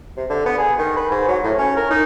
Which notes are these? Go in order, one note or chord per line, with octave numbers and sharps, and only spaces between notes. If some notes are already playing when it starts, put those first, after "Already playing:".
C3
D3
B3
G#4
D#3
B4
G#2
F#3
A2
C#4
A#4
D#4